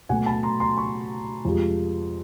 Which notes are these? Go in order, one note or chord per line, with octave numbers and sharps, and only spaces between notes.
B2 F#3 A3 F#5 G#5
A5 B5
A#5 C6
A#5 C6
B5 C#6
F2 C3 F3 G#3